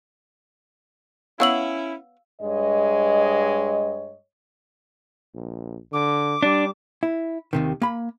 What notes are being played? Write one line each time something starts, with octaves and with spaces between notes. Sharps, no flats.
B3 C#4 E4 C#5 F5 F#5 E6 F#7
G2 G#3 C#5 D#5
A#1
D3 D6
G3 D4
E4
D#2 C3 D#3
A#3 B5